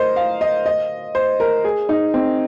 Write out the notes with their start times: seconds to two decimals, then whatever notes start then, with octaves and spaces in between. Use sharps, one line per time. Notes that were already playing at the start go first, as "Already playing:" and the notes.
Already playing: A#4 C5 D#5
0.16 F5
0.41 D#5
0.66 D#5
1.15 C5
1.40 A#4
1.64 G#4
1.89 D#4
2.14 C4